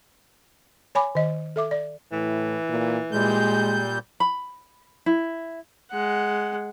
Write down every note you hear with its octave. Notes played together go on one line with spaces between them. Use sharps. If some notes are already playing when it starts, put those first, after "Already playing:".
C#5 G#5 B5 D6
D#3 D#5
A4 E5 D6
D5
A2 E3
A#2
A#2 G3 G#3 G6
B5
E4
G#3 F#5